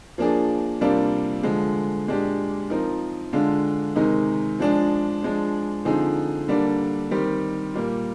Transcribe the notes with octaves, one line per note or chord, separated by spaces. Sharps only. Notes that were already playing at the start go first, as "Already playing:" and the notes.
F3 A#3 D4 G#4
C3 G3 A#3 D4 F4
D3 F3 G#3
A#2 G#3 D4 G4
F3 C4 D#4 A#4
D3 G#3 D4 F4
C3 D#3 G#3 D#4
F3 G#3 D4 G#4
F3 G#3 D4
D3 F3 C4 D#4 G#4
D3 G3 A#3 D4
D#3 G3 C4 G4
A#2 G3 A#3